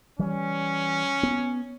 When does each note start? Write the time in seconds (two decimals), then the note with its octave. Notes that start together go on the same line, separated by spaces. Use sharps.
0.19 E3 G3 C#4
1.23 B3